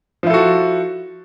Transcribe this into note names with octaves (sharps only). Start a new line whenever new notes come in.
F3 E4 F#4 A4